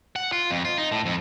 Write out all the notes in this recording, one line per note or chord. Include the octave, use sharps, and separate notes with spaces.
F#5
F4
F2
F4
D#4
A2
F2